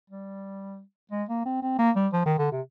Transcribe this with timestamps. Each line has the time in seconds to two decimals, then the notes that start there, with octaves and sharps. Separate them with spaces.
0.10 G3
1.12 G#3
1.29 A#3
1.46 C4
1.62 C4
1.79 A#3
1.96 G3
2.13 F3
2.26 D#3
2.38 D3
2.52 C3